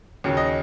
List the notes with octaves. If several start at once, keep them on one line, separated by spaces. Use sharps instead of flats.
D#2 C#3 F#3
D#5